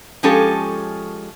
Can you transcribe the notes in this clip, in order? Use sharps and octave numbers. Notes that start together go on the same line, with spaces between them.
F3 G#3 C#4 G4 A4